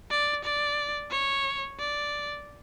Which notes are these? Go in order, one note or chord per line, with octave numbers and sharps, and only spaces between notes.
D5
D5
C#5
D5